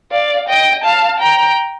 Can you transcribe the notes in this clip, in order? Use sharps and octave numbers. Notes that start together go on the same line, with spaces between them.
D5 F5
D#5 G5
F5 A5
G5 A#5